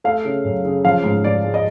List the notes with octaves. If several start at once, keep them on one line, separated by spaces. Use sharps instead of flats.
A3 F5
C#3
F#2
C#3
F3 F5
G#2
G#2 D5
G#3
D#5